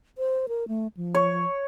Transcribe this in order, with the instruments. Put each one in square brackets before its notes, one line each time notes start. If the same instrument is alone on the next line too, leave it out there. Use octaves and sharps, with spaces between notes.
[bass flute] C5
A#4
A3
F3
[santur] C#5